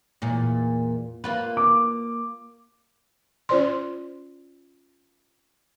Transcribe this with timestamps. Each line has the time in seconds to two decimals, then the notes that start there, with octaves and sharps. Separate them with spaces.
0.22 E2 A#2
1.24 A#3 F4 B4
1.57 D6
3.49 C#4 F4 C5 D5 C6